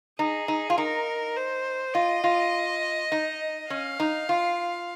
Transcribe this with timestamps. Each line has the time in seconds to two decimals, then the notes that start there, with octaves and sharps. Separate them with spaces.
0.19 D#4 G#4
0.48 D#4
0.70 F4
0.78 D#4 A#4
1.36 C5
1.95 F4 D#5
2.24 F4
3.12 D#4
3.70 C#4 F5
4.00 D#4
4.29 F4